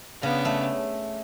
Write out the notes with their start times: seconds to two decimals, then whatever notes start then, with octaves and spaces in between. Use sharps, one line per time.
0.22 C#3 B3 D4
0.45 A3